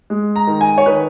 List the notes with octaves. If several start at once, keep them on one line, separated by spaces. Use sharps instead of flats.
G#3
A#5
D#3
G#5
C#5
D#3 B4